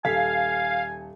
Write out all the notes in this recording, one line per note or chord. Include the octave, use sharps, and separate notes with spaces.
D#1 A4 F5 G#5 B6